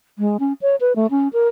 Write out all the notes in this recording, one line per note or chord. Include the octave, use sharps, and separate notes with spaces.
G#3
C#4
C#5
B4
A3
C#4
A#4